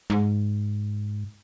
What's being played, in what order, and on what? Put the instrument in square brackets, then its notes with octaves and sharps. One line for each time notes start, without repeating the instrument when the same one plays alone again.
[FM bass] G#2